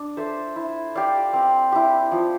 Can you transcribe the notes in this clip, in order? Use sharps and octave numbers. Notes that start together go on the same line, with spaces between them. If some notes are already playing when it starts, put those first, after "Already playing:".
Already playing: D4
A4 C5 E5
E4
G4 D5 F5
C4
E4 G4
F3